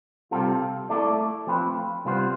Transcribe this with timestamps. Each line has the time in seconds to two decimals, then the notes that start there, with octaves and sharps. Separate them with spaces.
0.31 C3 G3 C4 F4 A4
0.89 A3 E4 A4 D5
1.47 F3 A3 C4 F4 B4
2.05 C3 G3 B3 F4 C5